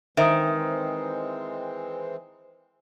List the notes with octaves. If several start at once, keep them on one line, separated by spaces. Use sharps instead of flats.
D#3 E3 G#3 C4 C5 E5 A#5 D#6